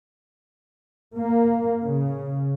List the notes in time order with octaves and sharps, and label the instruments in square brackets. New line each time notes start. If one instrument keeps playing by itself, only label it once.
[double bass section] A#3
C#3